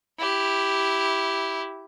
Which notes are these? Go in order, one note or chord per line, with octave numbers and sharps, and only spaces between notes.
E4 G4